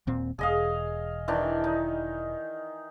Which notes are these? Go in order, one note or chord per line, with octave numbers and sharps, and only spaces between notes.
D#1 A#2 C4
E1 G#4 D#5 F5
D#3 E3 D4
D#4